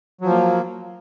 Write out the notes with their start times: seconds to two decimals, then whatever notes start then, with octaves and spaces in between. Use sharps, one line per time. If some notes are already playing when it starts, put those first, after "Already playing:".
0.21 F#3
0.25 F3
0.30 A#3